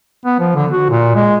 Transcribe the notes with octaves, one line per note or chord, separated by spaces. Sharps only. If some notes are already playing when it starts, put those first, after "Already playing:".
B3
F3
D3
F#4
A#2
G#3